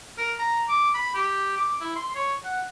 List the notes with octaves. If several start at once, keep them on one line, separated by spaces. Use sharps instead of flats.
A#4
A#5
D6
B5
G4
D6
E4
C6
C#5
F#5